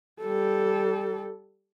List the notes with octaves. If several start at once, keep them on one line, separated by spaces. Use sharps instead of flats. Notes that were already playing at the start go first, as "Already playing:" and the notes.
G3 A4